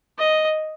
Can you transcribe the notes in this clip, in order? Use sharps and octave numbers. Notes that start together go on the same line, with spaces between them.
D#5